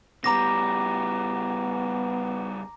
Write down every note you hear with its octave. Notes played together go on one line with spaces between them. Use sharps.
C#3 G3 B3 A#5 D6 A#6